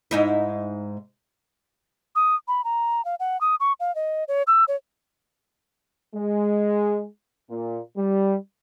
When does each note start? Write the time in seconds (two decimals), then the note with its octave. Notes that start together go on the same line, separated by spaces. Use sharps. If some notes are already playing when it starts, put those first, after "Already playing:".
0.11 G#2 D#4 E4
2.16 D#6
2.48 B5
2.64 A#5
3.05 F5
3.20 F#5
3.41 D#6
3.60 C#6
3.80 F5
3.95 D#5
4.28 C#5
4.47 E6
4.68 C#5
6.16 G#3
7.50 A#2
7.97 G3